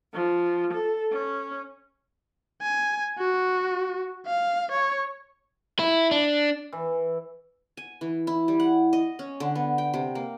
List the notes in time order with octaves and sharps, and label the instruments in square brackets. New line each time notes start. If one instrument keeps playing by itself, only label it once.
[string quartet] F3
A4
C#4
[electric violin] G#5
F#4
F5
C#5
[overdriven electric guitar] E4
D4
[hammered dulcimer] E3
[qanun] G#5
E3
E4
G3
F#5
D#5
C#4
D3
B3
G5
C3
A#3